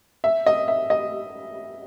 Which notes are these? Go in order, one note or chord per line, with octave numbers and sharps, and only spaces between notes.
E5
D#5
E5
D#5